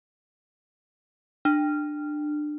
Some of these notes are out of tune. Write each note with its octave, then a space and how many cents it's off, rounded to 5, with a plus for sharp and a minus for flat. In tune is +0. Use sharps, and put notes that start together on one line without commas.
D4 +25